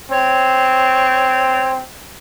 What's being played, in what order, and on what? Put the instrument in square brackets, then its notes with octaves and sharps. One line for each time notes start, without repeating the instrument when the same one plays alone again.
[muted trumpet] C4 [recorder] C#5